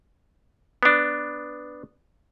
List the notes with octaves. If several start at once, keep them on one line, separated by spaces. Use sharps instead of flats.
B3 D4